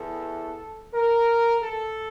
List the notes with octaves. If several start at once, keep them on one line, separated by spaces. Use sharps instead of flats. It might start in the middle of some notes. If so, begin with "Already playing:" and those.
Already playing: E2 E3 A4
A#4
A4